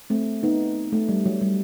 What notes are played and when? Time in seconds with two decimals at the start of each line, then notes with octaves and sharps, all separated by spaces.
0.10 A3 C4
0.43 B3 D#4
0.92 A3
1.09 G3
1.26 F#3
1.42 G3